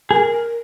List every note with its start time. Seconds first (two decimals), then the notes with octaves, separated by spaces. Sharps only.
0.11 G#4 A#4